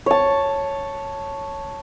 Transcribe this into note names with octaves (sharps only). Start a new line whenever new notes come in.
C#5 A5